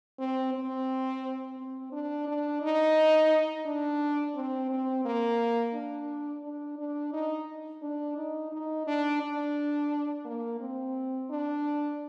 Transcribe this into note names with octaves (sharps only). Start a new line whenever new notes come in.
C4
C4
C4
D4
D4
D#4
D4
C4
C4
A#3
D4
D4
D4
D#4
D4
D#4
D#4
D4
D4
A#3
C4
D4